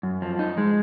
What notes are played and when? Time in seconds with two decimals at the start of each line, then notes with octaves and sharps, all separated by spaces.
0.03 F#2
0.22 F3
0.39 D#4
0.58 G#3